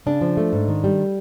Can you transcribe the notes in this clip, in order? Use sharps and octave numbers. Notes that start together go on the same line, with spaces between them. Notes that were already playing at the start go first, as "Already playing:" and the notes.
C#3 D4
F3
A3
G#2
D#3
G3